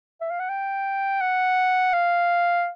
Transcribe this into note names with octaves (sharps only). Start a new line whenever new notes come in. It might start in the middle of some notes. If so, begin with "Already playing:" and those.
E5
F5
F#5
G5
F#5
F5